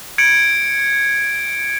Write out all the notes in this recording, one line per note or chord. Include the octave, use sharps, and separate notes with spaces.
G#6 C#7 D7